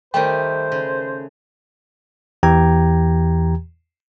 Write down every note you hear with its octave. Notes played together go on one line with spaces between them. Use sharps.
D#3 G3 A3 C5 G5
C#3
E2 E3 G4 G5 A#5 G#6